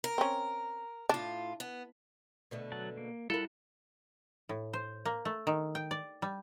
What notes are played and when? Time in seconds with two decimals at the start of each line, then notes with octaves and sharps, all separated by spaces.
0.04 A#4
0.18 C4 C#4
1.09 A2 D4 F4
1.60 B3
2.51 B2 D3 A3
2.72 F#3 F#5 A5
2.97 A#3
3.30 G3 E4 F4 A4 A#4 F#5 B5
4.49 A2
4.73 C5
5.05 A#3
5.25 A3
5.47 D#3
5.75 G5
5.91 D5
6.22 G3